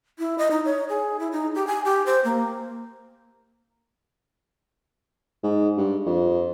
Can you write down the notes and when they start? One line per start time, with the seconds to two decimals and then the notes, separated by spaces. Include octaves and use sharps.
0.19 E4
0.38 D#5
0.51 D#4
0.65 C#5
0.89 G#4
1.20 E4
1.32 D#4
1.55 G4
1.67 G#5
1.85 G4
2.06 C5
2.24 A#3
5.43 G#2
5.77 G2
6.06 F2